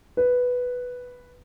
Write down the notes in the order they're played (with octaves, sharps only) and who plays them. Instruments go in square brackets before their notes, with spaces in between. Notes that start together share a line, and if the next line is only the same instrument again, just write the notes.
[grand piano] B4